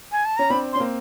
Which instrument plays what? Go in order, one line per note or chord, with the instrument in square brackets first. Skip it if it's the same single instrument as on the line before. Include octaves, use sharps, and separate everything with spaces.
[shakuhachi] G#5
A5
[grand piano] C#4 [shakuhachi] A#5
[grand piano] C4 D4 [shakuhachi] B5
[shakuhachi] C6
[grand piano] C#4
A#3 C4